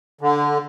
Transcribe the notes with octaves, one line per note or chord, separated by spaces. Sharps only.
D3